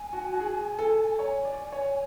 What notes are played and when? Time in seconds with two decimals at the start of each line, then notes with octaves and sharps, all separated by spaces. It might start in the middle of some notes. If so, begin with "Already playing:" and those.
Already playing: G#5
0.13 F#4
0.33 F#4
0.40 G#4
0.79 A4
1.19 C#5 A#5
1.23 G#5
1.45 D5
1.72 C#5